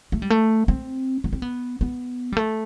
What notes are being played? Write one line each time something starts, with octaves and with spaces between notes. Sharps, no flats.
A3
G3
A3
C4
B3
C4
B3
B3
G3
A3